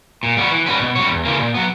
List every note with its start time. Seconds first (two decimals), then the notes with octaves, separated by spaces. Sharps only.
0.23 A#2
0.37 G3 B3 F#4
0.52 E3
0.66 G3 C#4 F#4 B4
0.80 B2
0.95 G3 C#4 F#4 C#5
1.10 E2
1.25 C#3 E3 A#3
1.40 A#2
1.54 F#3 B3